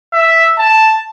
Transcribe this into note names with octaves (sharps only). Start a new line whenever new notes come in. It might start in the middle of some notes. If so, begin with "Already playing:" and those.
E5
A5